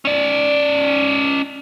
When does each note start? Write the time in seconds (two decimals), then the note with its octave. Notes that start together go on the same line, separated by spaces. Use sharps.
0.05 C#4 D5